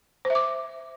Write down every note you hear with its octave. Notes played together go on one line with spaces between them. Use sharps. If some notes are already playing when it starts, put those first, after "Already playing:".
C5
E5
D6